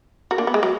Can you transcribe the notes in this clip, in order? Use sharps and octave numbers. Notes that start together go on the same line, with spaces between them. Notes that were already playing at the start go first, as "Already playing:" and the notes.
F#4 A#4
A#3 D4
B3
G#3
F#3